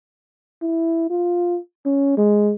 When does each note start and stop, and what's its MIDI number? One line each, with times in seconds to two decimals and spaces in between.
0.62 1.08 64
1.10 1.59 65
1.86 2.13 61
2.17 2.53 56